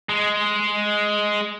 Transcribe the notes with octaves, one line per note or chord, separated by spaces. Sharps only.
G#3